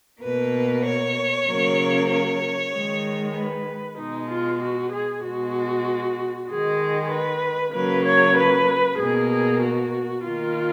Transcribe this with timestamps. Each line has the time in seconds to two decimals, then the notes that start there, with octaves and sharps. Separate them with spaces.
0.22 B2 A#3 B4
0.85 C#5
1.48 C#3 F#3 A#3
2.10 C#5
2.73 D#3 G#3
3.35 B4
3.97 B2 G#3 D#4
4.30 F4
4.61 F#4
4.92 G#4
5.23 B2 G#3 F#4
6.48 D#3 G#3 G#4
7.11 B4
7.73 C#3 F#3 A#3 B4
8.05 C#5
8.36 B4
8.98 B2 A#3 G#4
9.30 G#4
9.61 F#4
10.23 D#3 A#3 F4